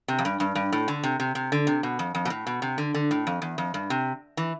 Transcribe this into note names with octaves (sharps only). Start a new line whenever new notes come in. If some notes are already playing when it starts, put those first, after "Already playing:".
C3
F2
G2
G2
G2
A2
D3
C3
C3
C3
D3
C3
B2
F2
F2
B2
A2
B2
C3
D3
D3
A2
F2
E2
F2
G2
C3
E3